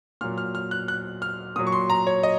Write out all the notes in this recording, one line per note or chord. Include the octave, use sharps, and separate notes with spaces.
A#2 F#3 F6
F6
F6
F#6
F#6
F6
A#2 F#3 D#6
C#6
C6
A#5
C#5
D#5